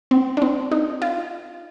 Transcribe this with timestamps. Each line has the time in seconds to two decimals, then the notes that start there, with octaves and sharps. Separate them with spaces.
0.11 C4
0.37 D4
0.42 C4
0.71 D#4
1.02 F4